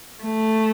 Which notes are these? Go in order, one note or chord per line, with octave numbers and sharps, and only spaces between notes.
A3